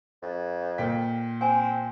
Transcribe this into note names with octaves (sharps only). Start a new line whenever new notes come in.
F2
A#2 G5 B6
C4 G#5